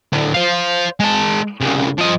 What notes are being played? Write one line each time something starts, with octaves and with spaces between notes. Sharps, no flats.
A2 D3
C5 F5
G#3 A5
C2 C#3
F3 D#5